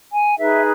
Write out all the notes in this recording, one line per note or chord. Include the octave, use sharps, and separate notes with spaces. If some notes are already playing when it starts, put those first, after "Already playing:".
G#5
D#4 G#4 B4 E5